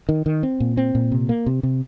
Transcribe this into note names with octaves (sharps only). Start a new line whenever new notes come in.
D#3
D#3
C4
A#2
C4
A#2
C3
A#3
C3
C3